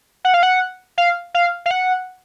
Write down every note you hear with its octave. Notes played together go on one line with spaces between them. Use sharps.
F#5
F5
F#5
F5
F5
F5
F#5